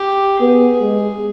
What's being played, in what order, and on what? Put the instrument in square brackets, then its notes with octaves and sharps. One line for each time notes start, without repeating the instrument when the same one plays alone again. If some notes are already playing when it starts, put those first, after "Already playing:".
Already playing: [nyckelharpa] G4
[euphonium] B3 [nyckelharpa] G#4
[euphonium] G#3